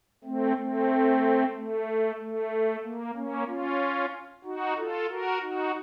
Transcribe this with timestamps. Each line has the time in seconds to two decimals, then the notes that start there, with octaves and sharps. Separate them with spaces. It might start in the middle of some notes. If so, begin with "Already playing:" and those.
0.24 A3 C4
0.56 A3 C4
1.53 A3
2.18 A3
2.83 A#3
3.15 A#3 C#4
3.47 C#4 F4
4.44 D#4 F#4
4.77 F4 A4
5.09 F#4 A#4
5.42 D#4 F#4